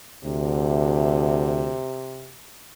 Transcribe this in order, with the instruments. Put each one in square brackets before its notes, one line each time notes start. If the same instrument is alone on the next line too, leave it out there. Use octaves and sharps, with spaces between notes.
[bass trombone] D2 [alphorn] C3